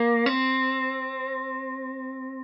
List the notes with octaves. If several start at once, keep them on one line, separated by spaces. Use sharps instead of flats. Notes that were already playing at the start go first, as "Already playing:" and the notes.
Already playing: A#3
C4